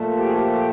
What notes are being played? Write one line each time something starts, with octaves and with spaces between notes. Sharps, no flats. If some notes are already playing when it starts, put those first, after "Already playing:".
Already playing: A#2 F3 A3
G4
G#4
G4
G4